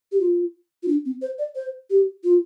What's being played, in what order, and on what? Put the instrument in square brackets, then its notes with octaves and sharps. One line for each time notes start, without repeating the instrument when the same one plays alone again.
[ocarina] G4
F4
F4
D4
C4
C5
D5
C5
G4
F4